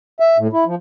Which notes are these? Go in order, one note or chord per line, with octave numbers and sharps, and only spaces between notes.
E5
A2
E4
F3